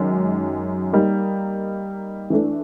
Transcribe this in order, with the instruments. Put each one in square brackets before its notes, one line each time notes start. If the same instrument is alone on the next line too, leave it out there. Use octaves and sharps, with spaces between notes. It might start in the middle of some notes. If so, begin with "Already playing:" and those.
Already playing: [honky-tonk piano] F#2 D#3 G#3
G3 A#3 D#4
E3 A3 D4